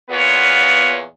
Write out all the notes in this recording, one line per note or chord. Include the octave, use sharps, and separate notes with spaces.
E2 A#2 B3 F4 B4 C#5